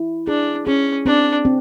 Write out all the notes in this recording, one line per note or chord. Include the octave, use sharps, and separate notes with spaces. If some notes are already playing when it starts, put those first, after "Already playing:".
Already playing: E4
D4 G#4
C#4 G#4
C4 D4
C4